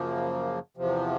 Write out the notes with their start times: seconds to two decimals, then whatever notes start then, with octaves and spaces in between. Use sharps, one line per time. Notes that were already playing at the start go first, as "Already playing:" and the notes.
Already playing: F#2 C#3 F3 A#3
0.77 E2 C3 F3